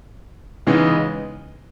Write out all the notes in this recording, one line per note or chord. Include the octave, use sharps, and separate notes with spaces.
C#3 E3 G#3 B3 D#4